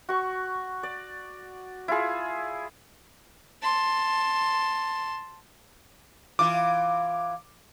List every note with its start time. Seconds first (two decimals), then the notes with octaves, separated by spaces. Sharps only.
0.09 F#4 C#6
0.83 D5
1.88 E4 F4 G#4
3.63 A5 C6
6.39 E3 F4 D6